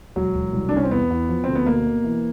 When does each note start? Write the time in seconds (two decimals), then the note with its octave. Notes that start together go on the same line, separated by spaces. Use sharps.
0.16 E1 F#3
0.35 E1
0.53 C2
0.69 D4
0.73 C2 C#4
0.84 C4
0.91 E2 B3
1.10 E2
1.29 F3
1.44 D2 C4
1.55 B3
1.66 B2 A#3
1.86 B2
2.04 E3